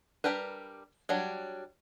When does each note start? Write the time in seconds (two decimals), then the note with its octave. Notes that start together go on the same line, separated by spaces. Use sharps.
0.24 G3 D4 G4 A#4 B4
1.09 F#3 G3 D4